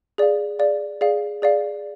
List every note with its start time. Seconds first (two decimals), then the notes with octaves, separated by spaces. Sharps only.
0.18 G#4 D5 F5
0.59 G#4 D5 F5
1.01 G#4 D5 F5
1.42 G#4 D5 F5